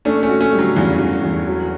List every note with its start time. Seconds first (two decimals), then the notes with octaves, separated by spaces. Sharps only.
0.05 A3 C#4 D4
0.23 A3 C#4
0.29 F#4
0.41 A3 C#4
0.53 G3
0.58 D3 F#3
0.76 E2 C#3 E3
0.99 E2
1.23 E2
1.47 F#3